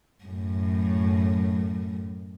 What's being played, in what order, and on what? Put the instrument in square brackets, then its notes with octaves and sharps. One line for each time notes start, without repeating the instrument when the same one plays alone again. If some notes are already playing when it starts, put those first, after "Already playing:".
[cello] F#2 A2